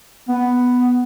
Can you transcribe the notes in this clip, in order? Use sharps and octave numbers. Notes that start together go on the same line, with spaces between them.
B3